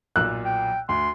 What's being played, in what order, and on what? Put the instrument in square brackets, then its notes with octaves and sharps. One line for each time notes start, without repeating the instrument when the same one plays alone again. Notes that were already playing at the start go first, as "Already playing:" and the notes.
[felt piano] B1 A#2 E6 [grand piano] F#6
[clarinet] G5
[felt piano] D2 [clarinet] C6